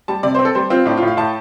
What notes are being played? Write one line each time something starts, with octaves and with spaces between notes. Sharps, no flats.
G3 A5
C3 D5
C5
C4
A4
G3 C5
C4 F4
A2 D4
F4
A2
F5
A2 A5